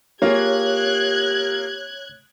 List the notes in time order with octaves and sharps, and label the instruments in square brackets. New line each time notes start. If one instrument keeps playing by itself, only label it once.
[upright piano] A#3 F4 G#4 [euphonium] G4 [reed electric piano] C#5 [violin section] F#6 G#6